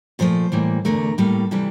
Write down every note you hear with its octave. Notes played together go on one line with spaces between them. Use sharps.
A#2 F3 A3 C5
A2 E3 G3 A#3
E2 D3 A3 A#4
A2 G3 A#3 A4
C3 E3 G3 A4